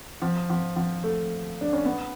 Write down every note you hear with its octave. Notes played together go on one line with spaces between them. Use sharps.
F3
F3
F3
A3
D4
C#4
B3